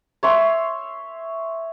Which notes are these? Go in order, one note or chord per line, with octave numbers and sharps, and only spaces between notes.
C#5 E5 C6